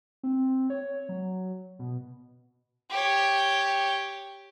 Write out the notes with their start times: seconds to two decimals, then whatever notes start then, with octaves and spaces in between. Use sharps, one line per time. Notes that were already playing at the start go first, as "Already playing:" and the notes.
0.23 C4
0.70 C#5
1.09 F#3
1.79 B2
2.90 G4 C#5